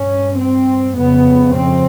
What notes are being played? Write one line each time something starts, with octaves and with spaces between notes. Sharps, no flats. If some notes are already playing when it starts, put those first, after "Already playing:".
Already playing: G2 C#4
C4
F2 C#3 B3
C4